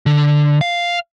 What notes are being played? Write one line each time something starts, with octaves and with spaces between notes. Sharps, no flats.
D3
F5